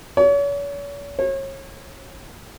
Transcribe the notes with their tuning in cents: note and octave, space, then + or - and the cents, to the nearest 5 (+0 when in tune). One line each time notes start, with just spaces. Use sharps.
C#5 +40
C#5 -35